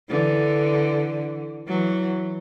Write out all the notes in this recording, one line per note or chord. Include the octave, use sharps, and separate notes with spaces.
D3 E3
E3 F#3